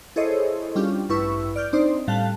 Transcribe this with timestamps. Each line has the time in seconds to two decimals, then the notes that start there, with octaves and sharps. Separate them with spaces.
0.16 E4 G#4 A4 C5 C#5 D#5
0.75 G3 C#4 D4 F4 G4
1.09 A1 G2 E4 B4 C#6 E6
1.56 D5 F6 G6
1.73 C4 D4 D#4 C5 D5
2.08 A2 G3 F5 A5 F#6